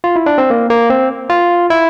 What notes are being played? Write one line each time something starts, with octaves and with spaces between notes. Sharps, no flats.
F4
E4
D4
C4
A#3
A#3
C4
F4
E4